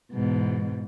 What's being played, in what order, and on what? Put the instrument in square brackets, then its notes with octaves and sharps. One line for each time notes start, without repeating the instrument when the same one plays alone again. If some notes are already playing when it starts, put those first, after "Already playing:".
[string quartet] E2 G#2 B2